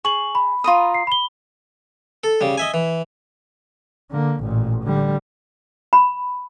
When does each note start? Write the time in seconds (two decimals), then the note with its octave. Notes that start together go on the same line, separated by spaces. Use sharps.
0.05 G#4 C#6 F#7
0.35 B5
0.64 F4 A#5 D#6
0.94 C7
1.07 B5 G7
2.24 A4
2.41 C#3 G3
2.58 D#5 E5 G#5
2.74 E3
4.11 D3 A#3
4.40 A1 A#2
4.84 D3 G3
5.93 B5